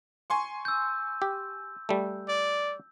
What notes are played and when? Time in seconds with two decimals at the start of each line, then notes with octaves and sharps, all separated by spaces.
0.30 G#5 C6 C#6
0.65 E6 G6
1.22 G4
1.89 G3 A3
2.28 D5